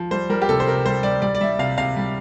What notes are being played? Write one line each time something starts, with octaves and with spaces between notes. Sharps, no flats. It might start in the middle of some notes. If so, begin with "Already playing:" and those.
Already playing: F3
G3 C5
G3 A#4
G4
C3 A4
C5
C3 A#4
G3 C5
G3 D5
G3 D5
D5
G3 E5
C3 F5
C3 F5
G3